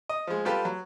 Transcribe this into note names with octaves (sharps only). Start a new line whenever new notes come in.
D#5
F3 G#3
G3 F4 G4 A4 B4
F#3